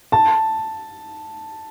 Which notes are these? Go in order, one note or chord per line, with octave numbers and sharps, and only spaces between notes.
A5